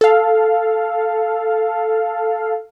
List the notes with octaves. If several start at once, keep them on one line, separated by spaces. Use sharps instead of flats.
A4 F5